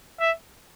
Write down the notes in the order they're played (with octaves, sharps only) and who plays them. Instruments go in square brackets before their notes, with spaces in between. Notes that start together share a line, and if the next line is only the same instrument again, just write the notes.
[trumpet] E5